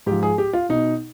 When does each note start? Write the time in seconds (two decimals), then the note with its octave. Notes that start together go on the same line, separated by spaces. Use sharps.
0.06 G#2 F3 G4
0.23 G#4
0.38 G4
0.53 F4
0.69 B2 D#4